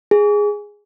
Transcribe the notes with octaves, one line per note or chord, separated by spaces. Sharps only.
G#4